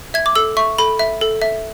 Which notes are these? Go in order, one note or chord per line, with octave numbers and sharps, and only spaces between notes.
E5 G#6
D6
A4 E6
E5 C#6
A4 B5
E5
A4
E5